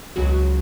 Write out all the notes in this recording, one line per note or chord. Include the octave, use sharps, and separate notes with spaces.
C#2 C#3 F#3 F#4